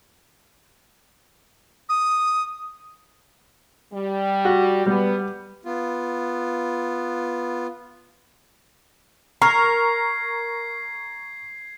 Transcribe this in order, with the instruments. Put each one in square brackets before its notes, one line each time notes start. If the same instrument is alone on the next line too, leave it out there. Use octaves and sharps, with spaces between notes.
[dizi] D#6
[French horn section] G3
[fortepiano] F#4
[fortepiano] G3 [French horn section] B3
[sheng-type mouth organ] B3 F4
[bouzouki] A#4 [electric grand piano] A#5 C#6 [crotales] G#6 C7